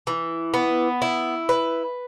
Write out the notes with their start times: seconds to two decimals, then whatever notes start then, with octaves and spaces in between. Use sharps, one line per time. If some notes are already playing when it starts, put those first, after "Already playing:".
0.07 E3
0.54 B3
1.02 E4
1.49 B4